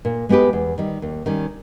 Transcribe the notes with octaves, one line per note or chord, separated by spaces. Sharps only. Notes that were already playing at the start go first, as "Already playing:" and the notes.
A#2
G#3 B3 G4 B4
E2
D#3 G3
D#2
D#3 G3 C#4